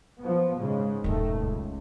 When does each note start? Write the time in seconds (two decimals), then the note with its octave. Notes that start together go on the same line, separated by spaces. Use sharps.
0.19 F3 B3
0.59 G#2 C#3 G#3
1.04 D#1 F#2 D#3 A3
1.35 C#2